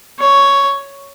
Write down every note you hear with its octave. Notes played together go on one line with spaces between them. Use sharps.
C#5